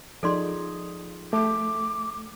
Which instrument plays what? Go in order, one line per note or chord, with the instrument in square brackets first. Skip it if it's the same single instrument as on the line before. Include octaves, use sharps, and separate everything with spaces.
[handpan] F3 D#4 G#4 [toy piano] A4 D5 C6
[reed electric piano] A3 [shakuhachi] D6